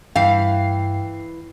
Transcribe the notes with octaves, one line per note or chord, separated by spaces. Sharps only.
G2 E3 F5 G5 C7